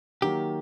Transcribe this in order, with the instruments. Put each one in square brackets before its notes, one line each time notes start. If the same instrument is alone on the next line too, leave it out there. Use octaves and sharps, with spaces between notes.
[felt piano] D#3 F#3 A#3 [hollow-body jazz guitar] G4